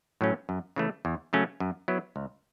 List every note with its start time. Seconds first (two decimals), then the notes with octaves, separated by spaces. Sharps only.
0.21 A2 F#3 A3 C#4
0.49 F#2
0.76 C#3 E3 A3
1.05 E2
1.33 C#3 F#3 A3 C#4
1.60 F#2
1.88 F#3 B3 E4
2.16 C#2